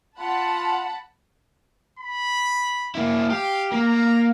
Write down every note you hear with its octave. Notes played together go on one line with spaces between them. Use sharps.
F4 F#5 A5 B5
B5
A#3 E4
G4 F5
A#3 A#5